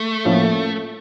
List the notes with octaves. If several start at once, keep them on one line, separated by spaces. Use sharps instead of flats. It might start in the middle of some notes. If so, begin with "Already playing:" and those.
Already playing: A3
A2 F3 A#3 C#4